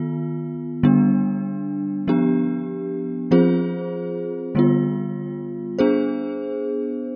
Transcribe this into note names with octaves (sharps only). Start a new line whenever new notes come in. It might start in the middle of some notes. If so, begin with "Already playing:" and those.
Already playing: D#3 B3 F4
D3 G3 B3 D4
F3 B3 D4 G4
F3 C4 F4 G#4 C5
D3 G3 B3 F4
B3 D4 G#4 C5